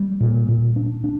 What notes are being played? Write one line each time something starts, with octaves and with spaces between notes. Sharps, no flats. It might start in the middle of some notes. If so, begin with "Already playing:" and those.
Already playing: G3
A#2
A#2
D4
D4